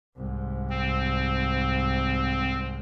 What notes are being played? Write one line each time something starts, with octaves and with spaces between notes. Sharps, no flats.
C2 G#2
C4